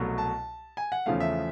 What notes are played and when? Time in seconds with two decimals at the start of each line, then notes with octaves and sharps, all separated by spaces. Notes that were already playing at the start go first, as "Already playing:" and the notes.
Already playing: C2 B2 F#3 A3
0.18 A5
0.77 G#5
0.92 F#5
1.06 E2 C#3 F3 A3 F5
1.20 E5